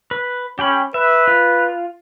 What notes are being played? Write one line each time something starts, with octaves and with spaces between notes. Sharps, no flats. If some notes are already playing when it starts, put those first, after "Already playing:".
B4
C#4 G4 G5 B5
B4 E5
F4